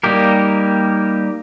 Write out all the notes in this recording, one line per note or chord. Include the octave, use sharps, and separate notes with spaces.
G3 A#3 D#4 G4 A#4